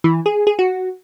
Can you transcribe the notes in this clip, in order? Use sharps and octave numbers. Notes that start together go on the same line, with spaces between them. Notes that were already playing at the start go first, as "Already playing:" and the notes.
E3
G#4
G#4
F#4